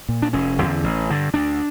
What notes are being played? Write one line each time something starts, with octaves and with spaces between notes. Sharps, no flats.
A#2
D4
F1 C#4
E2 D3
A1
G2 D3
D2 D4